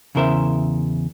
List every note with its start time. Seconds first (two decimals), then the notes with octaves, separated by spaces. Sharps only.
0.15 E2 C#3 E4 A#4 C5 E5